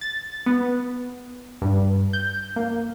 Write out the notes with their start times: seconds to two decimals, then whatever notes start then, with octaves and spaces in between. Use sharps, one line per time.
0.01 A6
0.46 B3
1.62 G2
2.13 G6
2.56 A#3